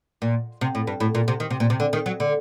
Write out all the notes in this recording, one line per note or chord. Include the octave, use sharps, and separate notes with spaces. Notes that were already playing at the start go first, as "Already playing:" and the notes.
A#2
C3
A2
G2
A2
A#2
C3
D#3
C3
A#2
C3
D3
D#3
F#3
D3